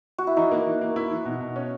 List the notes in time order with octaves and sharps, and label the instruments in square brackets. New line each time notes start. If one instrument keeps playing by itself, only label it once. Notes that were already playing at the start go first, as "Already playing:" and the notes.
[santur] F#4
E4
[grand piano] E3 [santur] D#4
[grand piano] A#3
E3
A#3
E4
E3
B2
B2
C#4